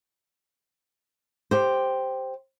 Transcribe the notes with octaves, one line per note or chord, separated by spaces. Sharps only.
G4 C5